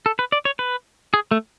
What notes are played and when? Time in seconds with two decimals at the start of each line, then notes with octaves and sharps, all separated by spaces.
0.06 A4
0.19 B4
0.32 D5
0.45 C#5
0.59 B4
1.14 G#4
1.31 A3